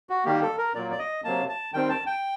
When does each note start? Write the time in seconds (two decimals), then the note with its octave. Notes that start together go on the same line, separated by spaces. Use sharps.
0.10 F#4
0.25 D#3 G3 A#3 G4
0.42 A4
0.58 A#4
0.75 A#2 F#3 A#3 D5
0.91 D5
0.99 D#5
1.24 C3 F#3 A#3 A5
1.49 A5
1.74 D#3 G3 C4 G5
1.89 A5
2.06 G5